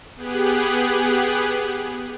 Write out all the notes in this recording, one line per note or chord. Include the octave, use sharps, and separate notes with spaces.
B3 G4 G#4 F#6